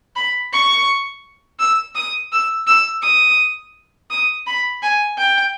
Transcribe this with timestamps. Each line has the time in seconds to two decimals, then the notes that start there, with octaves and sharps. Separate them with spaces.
0.16 B5
0.53 C#6
1.59 E6
1.95 D#6
2.32 E6
2.67 E6
3.03 D#6
4.10 D#6
4.47 B5
4.83 G#5
5.18 G5